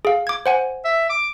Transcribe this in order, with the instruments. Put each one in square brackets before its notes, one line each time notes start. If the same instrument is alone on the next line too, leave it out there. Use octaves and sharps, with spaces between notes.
[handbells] G#4 F5
D6 G#6
C5 F#5 G#5
[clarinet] E5
D6